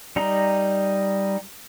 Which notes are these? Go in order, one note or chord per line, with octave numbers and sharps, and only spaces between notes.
G3 D#4 A#5